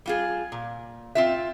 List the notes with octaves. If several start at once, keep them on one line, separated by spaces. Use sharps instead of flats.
G3 F4 G#4
A#2
C4 F4 E5